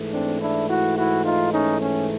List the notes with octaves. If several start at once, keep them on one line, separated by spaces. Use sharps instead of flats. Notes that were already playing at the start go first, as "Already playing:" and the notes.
Already playing: G#2 E3 A3
C4 D4
D4 E4
E4 F#4
E4 F#4
D#4 F4
C#4 D#4
C#4